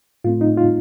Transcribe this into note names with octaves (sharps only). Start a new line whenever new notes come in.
A2 A3 C4 F4
D#4
F4